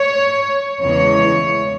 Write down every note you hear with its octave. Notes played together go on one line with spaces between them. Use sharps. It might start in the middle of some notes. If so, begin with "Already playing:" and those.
Already playing: C#5
E2 C#3 E3 G#3 C#5